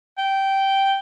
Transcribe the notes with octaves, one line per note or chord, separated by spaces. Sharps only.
G5